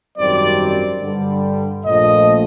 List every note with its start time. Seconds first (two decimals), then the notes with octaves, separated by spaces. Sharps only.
0.18 G#1 F#2 D#3 G3 C4 D5
1.01 G2 D3 G3
1.85 A#1 A#2 F3 A3 D#5